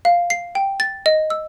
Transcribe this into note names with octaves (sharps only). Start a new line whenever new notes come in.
F5
C7
G5
A6
D#5
E6